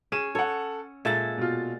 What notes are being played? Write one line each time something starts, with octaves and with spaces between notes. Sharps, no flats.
C#4 G#4 D#7 E7
A4 C#5 F#5
A#2 G#3 A4 E5 A6
B2 F4